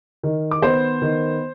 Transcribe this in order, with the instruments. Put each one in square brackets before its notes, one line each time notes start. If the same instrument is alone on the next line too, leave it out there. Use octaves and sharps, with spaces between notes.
[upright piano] D#3
D6
B3 C5 C6
D#3